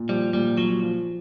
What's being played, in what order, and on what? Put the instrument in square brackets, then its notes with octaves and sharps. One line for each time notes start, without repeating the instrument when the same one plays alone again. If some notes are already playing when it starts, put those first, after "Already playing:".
Already playing: [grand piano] A#2
[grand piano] F3 [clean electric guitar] G3
[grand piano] A#2 [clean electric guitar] G3
[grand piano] F3 [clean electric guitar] F#3
[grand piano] F3